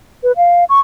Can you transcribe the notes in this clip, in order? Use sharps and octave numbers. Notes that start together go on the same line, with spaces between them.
B4
F5
C#6